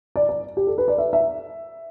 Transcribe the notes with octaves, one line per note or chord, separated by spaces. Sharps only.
D5
D5
G4
A4
B4
D5
E5
E5